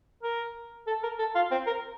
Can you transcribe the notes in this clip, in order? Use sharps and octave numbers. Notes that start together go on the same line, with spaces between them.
A#4
A4
A#4
A4
F4
C4
A#4